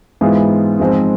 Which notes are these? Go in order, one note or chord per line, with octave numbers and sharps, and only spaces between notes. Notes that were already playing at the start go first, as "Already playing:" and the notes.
G#2 E3 G#3 B3 F4
G#2 F3 G#3 C4